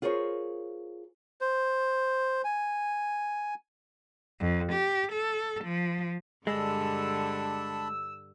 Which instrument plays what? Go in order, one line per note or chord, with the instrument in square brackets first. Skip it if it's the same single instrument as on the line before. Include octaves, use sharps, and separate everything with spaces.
[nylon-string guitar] F4 G#4 A#4 C5 C#5
[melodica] C5
G#5
[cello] F2
G4
A4
F3
[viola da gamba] G2 D3 [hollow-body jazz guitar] G#3 [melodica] D4 A5 B5 [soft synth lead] E6